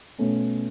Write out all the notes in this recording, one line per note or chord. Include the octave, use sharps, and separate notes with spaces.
B2 A3 C#4